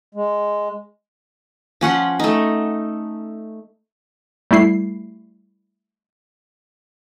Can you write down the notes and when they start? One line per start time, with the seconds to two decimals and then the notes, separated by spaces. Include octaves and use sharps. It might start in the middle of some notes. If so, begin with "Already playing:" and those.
0.15 G#3
1.81 F3 C#4 F#5 C6
2.19 A3 D#4
4.51 G3 A3 E4 C7